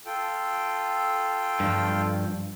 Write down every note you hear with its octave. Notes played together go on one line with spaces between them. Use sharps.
F4 A4 G5
G2 F3